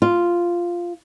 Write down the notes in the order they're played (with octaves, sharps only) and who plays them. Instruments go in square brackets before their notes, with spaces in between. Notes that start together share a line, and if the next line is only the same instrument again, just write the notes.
[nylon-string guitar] F4